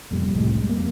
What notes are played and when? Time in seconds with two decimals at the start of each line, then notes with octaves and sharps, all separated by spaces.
0.11 F1 F2 A#2 G3
0.34 F1 C2 A2 G#3
0.55 F#2 G3
0.69 F2 A#3